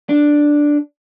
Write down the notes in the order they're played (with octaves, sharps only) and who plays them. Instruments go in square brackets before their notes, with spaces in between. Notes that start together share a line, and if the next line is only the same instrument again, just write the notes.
[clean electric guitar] D4